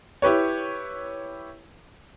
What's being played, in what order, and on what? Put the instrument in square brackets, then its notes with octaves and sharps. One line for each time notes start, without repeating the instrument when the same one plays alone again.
[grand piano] E4 G4 B4 C#5